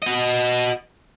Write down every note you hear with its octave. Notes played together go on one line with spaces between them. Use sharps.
F#4 D#5